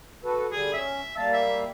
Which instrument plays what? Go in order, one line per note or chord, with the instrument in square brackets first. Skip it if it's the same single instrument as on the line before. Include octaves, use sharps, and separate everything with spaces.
[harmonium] F#4 A4 B4
[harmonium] D3 G3 [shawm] G#4
[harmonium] C#4 [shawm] E5
[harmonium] G3 A#3 F5 [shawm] A5
[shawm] E5